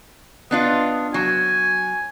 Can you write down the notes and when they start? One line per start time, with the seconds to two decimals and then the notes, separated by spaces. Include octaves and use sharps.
0.51 B3 D4 F4 D#5
1.14 F#3 G#5